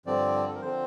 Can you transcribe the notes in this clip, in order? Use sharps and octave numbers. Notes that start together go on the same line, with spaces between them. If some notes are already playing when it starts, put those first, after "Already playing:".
G2 D3 F3 C4 D5
A4
A#4
D3 F3 C4 C5